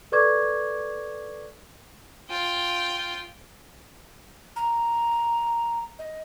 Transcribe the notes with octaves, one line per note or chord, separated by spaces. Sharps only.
A4 B4 D5 C#6 D6 G#6
F4 G5
A#5
D#5